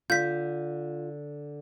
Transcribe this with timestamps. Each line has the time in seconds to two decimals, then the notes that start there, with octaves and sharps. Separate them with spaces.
0.10 D3 F4 G6 B6